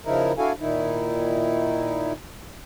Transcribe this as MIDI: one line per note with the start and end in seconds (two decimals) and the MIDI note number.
0.05 0.32 49
0.05 0.32 53
0.05 0.32 63
0.05 0.32 64
0.05 0.32 70
0.38 0.52 62
0.38 0.52 64
0.38 0.52 66
0.38 0.52 69
0.38 0.52 77
0.38 0.52 80
0.60 2.12 46
0.60 2.12 51
0.60 2.12 63
0.60 2.12 64